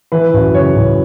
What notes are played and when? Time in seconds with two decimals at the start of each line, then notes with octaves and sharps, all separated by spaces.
0.12 E3 B4
0.34 F#2
0.54 C#3 C#5
0.76 F#2